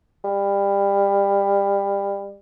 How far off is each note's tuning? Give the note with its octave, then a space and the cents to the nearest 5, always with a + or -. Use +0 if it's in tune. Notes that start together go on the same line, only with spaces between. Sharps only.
G3 +25